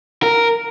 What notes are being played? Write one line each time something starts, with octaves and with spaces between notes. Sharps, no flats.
A#4